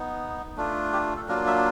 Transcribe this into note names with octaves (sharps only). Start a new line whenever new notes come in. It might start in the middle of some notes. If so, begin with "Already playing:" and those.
Already playing: B3 D#4
A3 D4 F4
G4
A4
F#3 A#3 D4 F4 A#4
E5